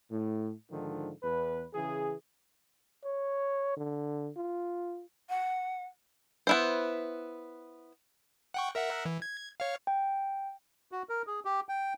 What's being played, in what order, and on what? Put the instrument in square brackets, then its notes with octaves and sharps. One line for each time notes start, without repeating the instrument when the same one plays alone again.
[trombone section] A2
G#2 D3 D#3 F3
E2 B4
C#3 E3 G#4
[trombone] C#5
D3
F4
[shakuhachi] F#5
[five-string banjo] B3 E4 C5
[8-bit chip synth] F#5 G5 C#6
A#4 E5 F#5
E3
G#6
C#5 F5
[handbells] G5
[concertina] F#4
A#4
G#4
G4
G5